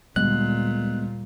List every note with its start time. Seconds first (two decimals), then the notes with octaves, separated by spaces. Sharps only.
0.16 D2 A#2 G3 G#3 B3 F#6